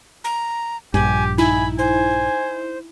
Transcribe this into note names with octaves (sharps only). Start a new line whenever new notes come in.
A#5
A#1 G2 G4 G#5
D#4 E4 G#5 B5
C5 G#5